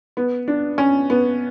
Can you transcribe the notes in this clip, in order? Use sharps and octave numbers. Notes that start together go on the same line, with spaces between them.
B3
D4
C#4
B3